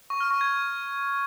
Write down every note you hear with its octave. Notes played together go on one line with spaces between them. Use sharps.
C#6
F6
C#6
G#6